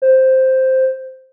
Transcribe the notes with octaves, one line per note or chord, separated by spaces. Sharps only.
C5